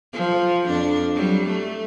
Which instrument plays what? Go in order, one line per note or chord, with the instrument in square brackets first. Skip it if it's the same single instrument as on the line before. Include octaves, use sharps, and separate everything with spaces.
[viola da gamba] F3
F2 D4
F#3 G3
A3